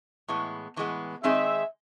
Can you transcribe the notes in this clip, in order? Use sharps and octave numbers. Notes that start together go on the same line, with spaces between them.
A2 E3 G#3 B3
A2 E3 G#3 B3
D#3 G#3 C4 D#4 G#4 E5